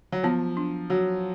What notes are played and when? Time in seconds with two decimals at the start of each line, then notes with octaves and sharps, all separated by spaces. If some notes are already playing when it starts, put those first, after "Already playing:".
0.12 F#3
0.23 F3 B3
0.57 D4
0.90 F#3 F#4